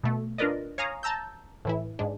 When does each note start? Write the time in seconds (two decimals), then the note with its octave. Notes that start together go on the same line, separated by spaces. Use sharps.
0.04 B2 A3
0.38 D4 F4 A#4 B4 D5 D#5
0.78 C#5 F5 G#5 A#5 D#6
1.03 A5 A#5 E6 G6
1.65 A2 E3 E4
1.99 G#2 G#3 D4